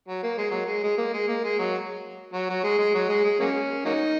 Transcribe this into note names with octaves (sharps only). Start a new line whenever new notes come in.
F#3
A#3
G#3
F#3
G#3
G#3
A#3
G#3
A#3
G#3
F#3
F#3
F#3
G#3
G#3
F#3
G#3
G#3
F#3 A#3 C#4
F#3 A#3 D#4